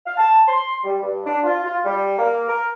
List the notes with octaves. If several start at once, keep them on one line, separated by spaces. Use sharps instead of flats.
F5
A5
C6
G3
G2
D4
F4
F4
G3
A#3
A#4